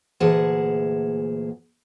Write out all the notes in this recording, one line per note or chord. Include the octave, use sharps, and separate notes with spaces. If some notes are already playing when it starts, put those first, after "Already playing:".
D2 A#2 E3 G#4 F#5 A5